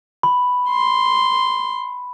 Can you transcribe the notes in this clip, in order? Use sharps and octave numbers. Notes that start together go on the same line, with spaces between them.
B5
C6